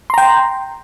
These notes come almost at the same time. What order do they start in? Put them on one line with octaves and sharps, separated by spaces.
C6 A#5 G5